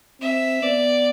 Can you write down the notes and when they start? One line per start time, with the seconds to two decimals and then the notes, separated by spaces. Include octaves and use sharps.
0.21 C4 E5
0.62 B3 D5